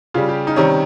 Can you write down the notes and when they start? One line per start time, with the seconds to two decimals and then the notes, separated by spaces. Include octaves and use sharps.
0.14 C#3 G3 F4
0.29 G4
0.47 D#4
0.56 C3 D#3 G3 C#4